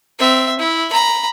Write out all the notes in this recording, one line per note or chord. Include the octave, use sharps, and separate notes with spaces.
C4 E5
E4
A#5 B5